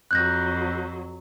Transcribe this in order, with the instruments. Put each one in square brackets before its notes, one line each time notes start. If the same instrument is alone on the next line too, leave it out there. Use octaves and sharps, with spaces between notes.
[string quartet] F2 F#3 [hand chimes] F#6 G6 A#6